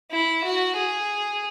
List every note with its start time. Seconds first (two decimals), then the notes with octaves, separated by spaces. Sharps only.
0.11 E4
0.44 F#4
0.77 G#4